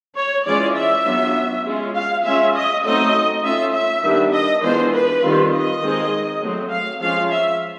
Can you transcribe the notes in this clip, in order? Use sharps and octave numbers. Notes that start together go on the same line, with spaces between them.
C#5
E3 G#3 C#4 F4 D5
E5
F#3 B3 D4 F4
G#3 C#4 F4
F5
G#3 C#4 F4 E5
D#5
F#3 A3 C4 D#4 D#5
A3 C#4 F4 E5
E5
D#3 G3 B3 D4
D#5
E3 G#3 B3 D4 F4 C5
B4
D#3 G3 C4 F4
D#5
D#3 G#3 C4
F#3 A3 C4
F5
F3 G#3 C#4 F4 F5
E5